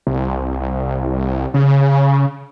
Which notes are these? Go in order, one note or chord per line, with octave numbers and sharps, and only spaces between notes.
C2
C#3